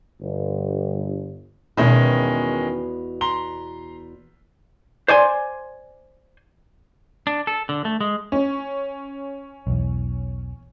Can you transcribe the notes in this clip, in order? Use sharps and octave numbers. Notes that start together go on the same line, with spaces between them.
G1
E2 B2 D#3 G#3 C#4 E4
A#5 C6 G7
C5 D5 G#5 C6
D4
A4
D3
A3
G#3
C#4
B1 E2